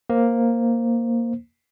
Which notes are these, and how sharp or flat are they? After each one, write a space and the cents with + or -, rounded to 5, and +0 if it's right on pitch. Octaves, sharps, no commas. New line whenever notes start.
A#3 +0 C5 +0